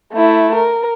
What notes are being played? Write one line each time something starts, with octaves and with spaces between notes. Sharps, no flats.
A3 E4
A#4